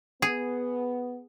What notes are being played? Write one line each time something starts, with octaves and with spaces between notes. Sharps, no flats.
B3 G#4